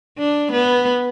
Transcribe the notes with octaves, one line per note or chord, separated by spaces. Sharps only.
D4
B3